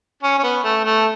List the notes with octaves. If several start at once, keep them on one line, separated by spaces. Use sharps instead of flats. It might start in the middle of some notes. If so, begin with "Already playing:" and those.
C#4
C#4
B3
A3
A3